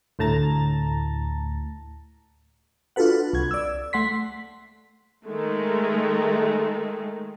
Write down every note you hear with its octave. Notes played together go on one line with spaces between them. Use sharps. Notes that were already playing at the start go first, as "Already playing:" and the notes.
D2 A2 A5 A#5 A6
D4 F4 F#4 A4 B4 F#5
C2 G#6
D5 E6
A3 F#5 C6 B6
D#3 G#3 A3